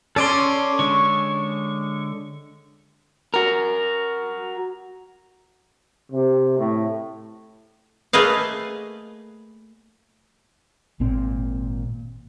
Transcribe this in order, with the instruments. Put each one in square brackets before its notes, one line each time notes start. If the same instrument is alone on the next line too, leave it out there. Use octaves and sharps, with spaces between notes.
[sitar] C#4 [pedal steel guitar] A4 D5 C6
[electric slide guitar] D3 G#3 [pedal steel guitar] C#6
[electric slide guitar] F#4 A#4
[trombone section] C3
A2
[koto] A3 A#3 G#4 B4 D#5 F5
[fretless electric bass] G#1 A#2 C4